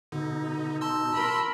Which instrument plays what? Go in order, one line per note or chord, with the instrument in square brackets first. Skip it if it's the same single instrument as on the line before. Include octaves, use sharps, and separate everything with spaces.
[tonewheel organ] B2 D#4 [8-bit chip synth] D3
[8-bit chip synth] A5 C6 E6
[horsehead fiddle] A#4 B5